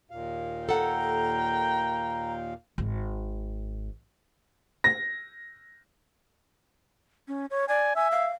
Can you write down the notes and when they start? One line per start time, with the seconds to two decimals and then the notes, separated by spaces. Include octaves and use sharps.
0.11 D#2 A#2 F5
0.69 A4 F#5 G5 A#5
2.78 G#1
4.84 A#6
7.28 C#4
7.50 C#5
7.69 D5 G#5
7.96 E5 G#5
8.12 F5